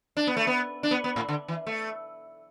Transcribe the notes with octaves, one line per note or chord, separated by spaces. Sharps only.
D4
B3
A3
B3
D4
B3
B3
A2
D3
E3
A3